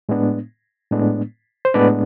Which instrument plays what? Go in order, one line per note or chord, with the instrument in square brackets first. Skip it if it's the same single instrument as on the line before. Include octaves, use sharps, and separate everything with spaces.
[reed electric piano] A2 G#3 B3 D4
A2 G#3 B3 D4
C5
A2 G#3 B3 D4 B4 D5